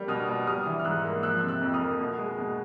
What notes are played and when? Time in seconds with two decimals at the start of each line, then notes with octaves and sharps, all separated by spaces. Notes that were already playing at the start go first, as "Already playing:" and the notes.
Already playing: G3 A#3
0.08 B2 D#6 F6
0.28 B2
0.47 G3 D#6 F6
0.66 E3
0.79 F6
0.85 G#2 E6 F#6
1.05 A#3
1.23 F3 E6 F#6
1.43 C3
1.48 E6 F#6
1.61 F2
1.74 D#6 F6
1.81 A#3
2.00 B2
2.18 G#3
2.38 B2